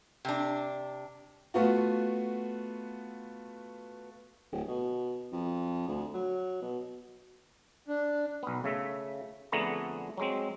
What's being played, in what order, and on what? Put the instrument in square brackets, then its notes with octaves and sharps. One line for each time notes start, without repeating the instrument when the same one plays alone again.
[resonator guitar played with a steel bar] C3 D4
[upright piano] A3 B3 F4 F#4
[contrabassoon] D1
B2
F2
D2
F#3
B2
[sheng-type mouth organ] D4
[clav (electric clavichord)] B1 B3
C#3 A3 E5
F2 D3 A3 B3 G#4 A#5
F#3 G#3 C4